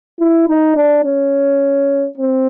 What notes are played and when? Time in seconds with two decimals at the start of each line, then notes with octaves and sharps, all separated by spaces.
0.20 E4
0.48 D#4
0.76 D4
1.05 C#4
2.18 C4